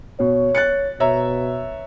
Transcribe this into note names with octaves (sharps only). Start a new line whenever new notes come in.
B2 C#5
F#6 A6 C#7
B2 C#5 E5 A#5